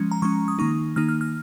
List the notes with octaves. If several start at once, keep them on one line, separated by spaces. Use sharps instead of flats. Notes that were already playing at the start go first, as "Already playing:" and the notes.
Already playing: F3 G#3 C#4
A#5
F3 G#3 C#4 C#6
D#6
D#3 A#3 D#4 C#6
D#3 A#3 D#4 F6
F6
F6